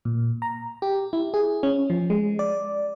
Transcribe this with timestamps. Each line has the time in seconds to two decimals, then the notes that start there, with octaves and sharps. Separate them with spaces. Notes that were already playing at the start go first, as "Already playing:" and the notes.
0.05 A#2
0.42 A#5
0.82 G4
1.13 E4
1.34 G#4
1.63 C#4
1.90 F3
2.10 G#3
2.39 D5